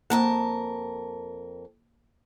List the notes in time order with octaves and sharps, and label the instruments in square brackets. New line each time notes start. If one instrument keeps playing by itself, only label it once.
[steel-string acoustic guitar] F2 A#4 A5 [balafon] A#3